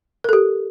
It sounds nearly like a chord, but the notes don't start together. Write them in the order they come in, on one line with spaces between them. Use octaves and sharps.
A#4 A4 G4